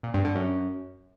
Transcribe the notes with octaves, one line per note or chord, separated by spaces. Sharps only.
A#2
G2
D3
F#2